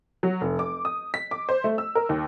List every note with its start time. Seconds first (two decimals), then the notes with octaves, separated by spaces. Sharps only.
0.23 F#3
0.41 F1
0.59 D6
0.85 D#6
1.14 B6
1.31 D6
1.49 C5
1.64 A3
1.78 E6
1.95 A#4
2.09 D#2